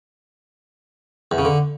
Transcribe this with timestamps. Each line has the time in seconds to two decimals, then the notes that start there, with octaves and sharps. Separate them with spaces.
1.31 E2
1.38 C#3
1.45 D3